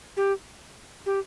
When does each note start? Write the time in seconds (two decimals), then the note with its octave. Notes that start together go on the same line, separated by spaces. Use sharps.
0.17 G4
1.06 G4